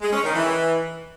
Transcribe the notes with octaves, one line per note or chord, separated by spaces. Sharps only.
G#3
C#4
D#3
E3